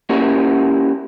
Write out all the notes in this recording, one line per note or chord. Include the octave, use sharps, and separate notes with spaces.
A#3 C#4 E4 F#4 G4 A#4